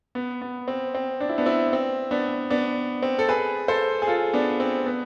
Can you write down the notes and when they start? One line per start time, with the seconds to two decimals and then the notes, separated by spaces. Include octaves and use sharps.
0.15 B3
0.42 B3
0.68 C4
0.94 C4
1.20 D4
1.29 E4
1.38 B3 D4
1.46 C4 E4
1.73 C4
2.11 B3 D4
2.50 B3 D4
3.02 C4
3.19 A4
3.29 G#4 B4
3.68 A4 C5
4.02 G#4
4.07 F4 A4
4.33 B3 D4
4.60 C4
4.86 B3